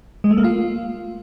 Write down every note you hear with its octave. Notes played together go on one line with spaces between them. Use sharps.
G#3
A3
A#3
F4